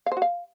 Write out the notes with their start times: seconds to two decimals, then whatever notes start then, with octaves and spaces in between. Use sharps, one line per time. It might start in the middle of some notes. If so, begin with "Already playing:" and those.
0.06 F5
0.12 C5
0.17 F#4
0.22 F5